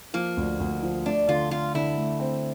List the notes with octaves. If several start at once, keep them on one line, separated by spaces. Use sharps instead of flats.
F3 A#3
D2
D2
F3
A3 D4
D3 F4
D3 F4
D3 E4
A3
C4